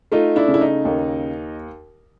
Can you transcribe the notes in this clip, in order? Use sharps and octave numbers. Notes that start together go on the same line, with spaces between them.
A3 D#4 F4
D4 E4
C#3
E4
D#4
D#2